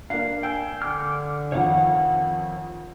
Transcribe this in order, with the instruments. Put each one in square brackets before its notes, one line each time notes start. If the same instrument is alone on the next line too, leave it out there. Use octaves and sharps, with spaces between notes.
[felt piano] A#3 D4 [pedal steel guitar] F5
[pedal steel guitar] G5 [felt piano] G#5 E6
[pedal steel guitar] D3 D6 F6
[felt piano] F2 D#3 [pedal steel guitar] C#5 F5 F#5